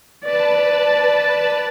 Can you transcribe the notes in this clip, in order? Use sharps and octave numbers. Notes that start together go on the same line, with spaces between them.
B4 D5 A5